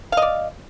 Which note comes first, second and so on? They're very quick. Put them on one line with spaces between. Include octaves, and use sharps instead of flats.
F5 D#5 D5